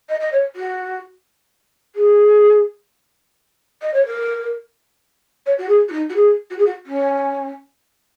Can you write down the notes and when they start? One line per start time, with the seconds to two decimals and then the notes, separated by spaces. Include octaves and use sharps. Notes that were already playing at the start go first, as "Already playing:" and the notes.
0.09 D#5
0.21 D#5
0.33 C#5
0.56 F#4
1.96 G#4
3.82 D#5
3.94 C#5
4.06 A#4
5.46 C#5
5.59 F#4
5.69 G#4
5.88 F#4
5.92 D#4
6.10 F#4
6.16 G#4
6.51 F#4
6.59 G#4
6.66 F#4
6.87 C#4